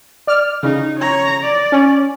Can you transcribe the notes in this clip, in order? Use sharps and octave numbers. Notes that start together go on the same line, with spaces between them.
D5 F6
C#3 D#4
C#5 A#5
D5
C#4